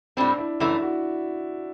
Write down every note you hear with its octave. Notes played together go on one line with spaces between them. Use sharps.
A2 G3 C4 D4
E4
F#2 E3 A3 E4
F#4